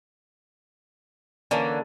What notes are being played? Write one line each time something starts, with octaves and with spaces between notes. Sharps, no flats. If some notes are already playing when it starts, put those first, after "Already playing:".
D3 E3 A#3 C#4